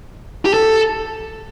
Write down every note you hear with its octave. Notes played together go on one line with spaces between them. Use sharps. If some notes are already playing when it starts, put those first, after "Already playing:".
G4
A4